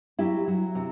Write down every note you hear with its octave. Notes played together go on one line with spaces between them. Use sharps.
F#3 E4 G4
F#3
C3